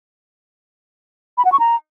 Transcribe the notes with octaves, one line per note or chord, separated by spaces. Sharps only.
B5
F#5
C#6
A#5